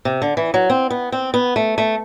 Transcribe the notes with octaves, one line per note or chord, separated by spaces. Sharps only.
C3
D3
E3
F#3
C4
B3
C4
B3
A3
A3